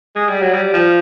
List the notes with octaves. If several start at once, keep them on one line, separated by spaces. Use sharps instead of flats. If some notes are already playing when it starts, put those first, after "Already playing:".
G#3
G3
F#3
G3
F3